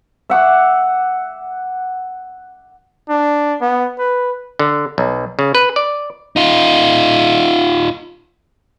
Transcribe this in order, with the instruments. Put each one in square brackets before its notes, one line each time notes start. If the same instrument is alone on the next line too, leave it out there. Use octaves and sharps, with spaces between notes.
[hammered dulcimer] E5 F#5 D6
[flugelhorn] D4
B3
B4
[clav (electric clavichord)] D3
B1
C#3
B4
D5
[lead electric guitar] D#4 F4